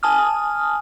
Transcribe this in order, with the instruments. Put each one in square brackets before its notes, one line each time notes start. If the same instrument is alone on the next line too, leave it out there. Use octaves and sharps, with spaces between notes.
[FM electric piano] G#5 A5 D#6 F6